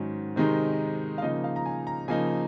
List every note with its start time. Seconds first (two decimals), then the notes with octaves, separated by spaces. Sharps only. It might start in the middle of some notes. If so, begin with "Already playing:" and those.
Already playing: G#2 D#3 F#3 C#4
0.36 C3 D#3 G#3 D#4
1.18 F5
1.22 C#3 F3 A#3 D#4 D#5
1.44 F5
1.56 A#5
1.66 G#5
1.87 A#5
2.08 C#3 F3 A#3 D#4 G#5